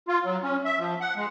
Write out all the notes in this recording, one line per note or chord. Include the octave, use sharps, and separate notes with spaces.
F4
F#3
C#4
E5
F3
F#5
G#3